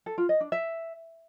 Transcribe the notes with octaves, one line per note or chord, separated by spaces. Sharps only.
A4
F4
D#5
D4
E5